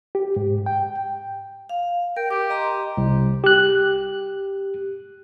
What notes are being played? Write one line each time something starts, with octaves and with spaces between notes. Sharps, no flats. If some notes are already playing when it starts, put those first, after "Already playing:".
G4
G#2
G5
F5
A#4 G5
G4 D6
D#5 A#5 C6
C2
G4 F#6